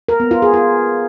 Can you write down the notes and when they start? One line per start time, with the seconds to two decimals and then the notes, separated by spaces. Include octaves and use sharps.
0.08 A#4
0.20 B3
0.31 F4
0.42 G#4
0.54 F4